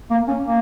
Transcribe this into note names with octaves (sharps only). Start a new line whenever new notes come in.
A#3
C#4
A#3